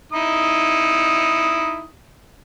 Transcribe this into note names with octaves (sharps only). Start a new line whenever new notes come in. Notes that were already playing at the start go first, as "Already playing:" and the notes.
D#4 E4 D#6